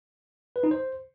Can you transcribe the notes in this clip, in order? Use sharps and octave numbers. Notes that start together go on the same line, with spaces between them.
B4
D#4
C5